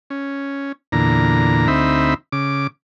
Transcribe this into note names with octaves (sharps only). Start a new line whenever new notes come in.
C#4
E2 A#2 D3 A#5
D2 C4 D#4 E5 B5
C#3 D6